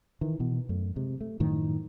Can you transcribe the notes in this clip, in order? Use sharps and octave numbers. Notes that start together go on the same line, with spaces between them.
D#3 E3
B2 E3
F#2 A3
C3 G#3
A3
F#2 A2 D#3 F3